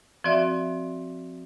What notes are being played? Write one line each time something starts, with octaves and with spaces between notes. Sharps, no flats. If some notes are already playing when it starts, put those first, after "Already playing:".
F3 C4 F#4 D5 E5